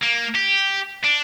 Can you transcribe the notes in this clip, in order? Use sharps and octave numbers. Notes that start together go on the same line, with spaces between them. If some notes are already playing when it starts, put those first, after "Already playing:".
A#3
G4
D4